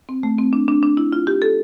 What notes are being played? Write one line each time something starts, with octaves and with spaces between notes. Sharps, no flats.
C4
A3
C4
D4
D4
D4
E4
F4
G4
A4